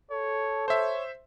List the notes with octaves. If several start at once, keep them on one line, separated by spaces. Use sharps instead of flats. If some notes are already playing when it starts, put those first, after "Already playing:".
A4 C#5
C5 C#5 E5